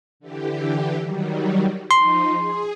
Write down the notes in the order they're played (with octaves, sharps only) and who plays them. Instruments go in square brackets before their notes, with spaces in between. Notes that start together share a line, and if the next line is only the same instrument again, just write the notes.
[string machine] D3 E3 G4
D#3 F#3 G3
[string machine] F3 D#4 [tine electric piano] C6
[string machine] G#4